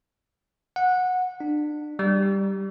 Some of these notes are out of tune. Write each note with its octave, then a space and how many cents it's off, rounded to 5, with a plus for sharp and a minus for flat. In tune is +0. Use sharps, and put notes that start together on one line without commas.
F#5 -15
D4 +30
G3 +0